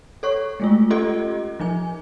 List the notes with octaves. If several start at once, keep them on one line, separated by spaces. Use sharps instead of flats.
A4 C#5 C#6
G#3 A3 F4
C#4 F4 G4 A4 D#5
F3 D#4 G#5